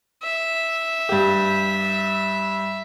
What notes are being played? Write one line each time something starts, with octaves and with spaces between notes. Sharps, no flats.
E5
G2 G4